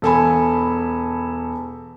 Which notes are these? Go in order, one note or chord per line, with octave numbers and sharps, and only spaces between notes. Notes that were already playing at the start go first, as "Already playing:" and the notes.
E1 A4 G#5 B5